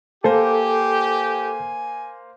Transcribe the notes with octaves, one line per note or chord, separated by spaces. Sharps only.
A#3 G4 A4 C5 G#5